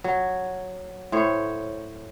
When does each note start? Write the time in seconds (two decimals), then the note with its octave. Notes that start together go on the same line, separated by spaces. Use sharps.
0.04 F#3
1.12 A2 C5 C#5